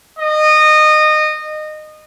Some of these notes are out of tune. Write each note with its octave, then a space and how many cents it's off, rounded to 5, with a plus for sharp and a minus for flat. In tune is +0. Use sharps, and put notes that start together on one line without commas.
D#5 -20